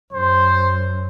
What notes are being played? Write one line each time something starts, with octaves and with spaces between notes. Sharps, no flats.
F#2 C5